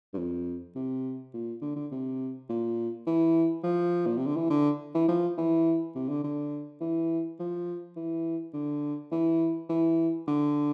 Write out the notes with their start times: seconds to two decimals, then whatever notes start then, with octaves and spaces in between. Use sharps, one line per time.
0.14 G2
0.18 F2
0.76 C3
1.34 A#2
1.62 D3
1.76 D3
1.91 C3
2.49 A#2
3.07 E3
3.63 F3
4.06 A#2
4.17 C3
4.26 D3
4.36 E3
4.50 D3
4.94 E3
5.08 F3
5.38 E3
5.95 C3
6.09 D3
6.24 D3
6.81 E3
7.39 F3
7.96 E3
8.54 D3
9.12 E3
9.69 E3
10.27 D3